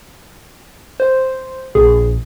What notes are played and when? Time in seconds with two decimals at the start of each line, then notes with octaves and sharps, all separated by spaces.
1.00 C5
1.75 A#1 G#4